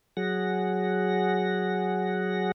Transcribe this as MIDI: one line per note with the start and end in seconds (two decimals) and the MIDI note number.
0.17 2.52 54
0.17 2.52 68
0.17 2.52 78
0.17 2.52 94